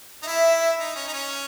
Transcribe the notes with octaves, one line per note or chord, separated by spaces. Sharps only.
D#4
E4 E5
D#4
C#4
D#4
C#4